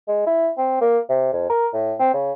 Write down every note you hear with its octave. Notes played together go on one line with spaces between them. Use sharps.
G#3
E4
C4
A#3
C3
F2
A#4
A2
C4
C#3